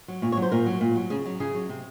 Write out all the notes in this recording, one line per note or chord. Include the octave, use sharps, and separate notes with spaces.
F#3
A#2 C#5
C#5
F#3
C5
A#2 A#4
F#3
A#2
F#3
C#3 G#4
F#3
C#3 G#4
F#3
C3